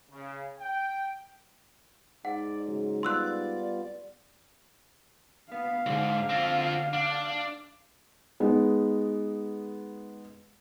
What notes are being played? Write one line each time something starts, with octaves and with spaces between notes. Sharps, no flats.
C#3
G5
G#2 D5 F#5
C#3 F#3 G#3
G3 B3 F4 D5 C6 E6 F#6
B3 F5
B1 G#2 D3
C4 F4
D4
G#3 B3 D#4